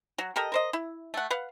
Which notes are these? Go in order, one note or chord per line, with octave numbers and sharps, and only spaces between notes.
F#3 F#4
G4 A4 A#4 D#5
A#4 C5 D#5
E4
A3 F#5
B4 F5 F#5